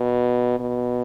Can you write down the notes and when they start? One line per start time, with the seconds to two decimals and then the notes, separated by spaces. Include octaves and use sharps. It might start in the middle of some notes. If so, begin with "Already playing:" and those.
Already playing: B2
0.60 B2